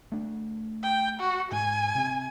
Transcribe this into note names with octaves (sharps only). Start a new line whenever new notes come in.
A3 D4
G5
F#4
G#2 G#5
C3 C4